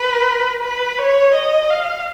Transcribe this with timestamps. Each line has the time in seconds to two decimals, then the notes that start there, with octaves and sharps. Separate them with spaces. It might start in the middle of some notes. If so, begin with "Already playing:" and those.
Already playing: B4
0.63 B4
0.98 C#5
1.34 D#5
1.70 F5